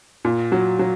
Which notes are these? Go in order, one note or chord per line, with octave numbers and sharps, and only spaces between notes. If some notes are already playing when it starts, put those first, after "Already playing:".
A#2
F#3
F#3